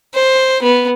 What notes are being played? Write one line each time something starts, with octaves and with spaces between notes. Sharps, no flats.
C5
B3